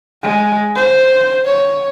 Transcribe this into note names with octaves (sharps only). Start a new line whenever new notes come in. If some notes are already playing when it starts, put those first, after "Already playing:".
G#3
C5
C#5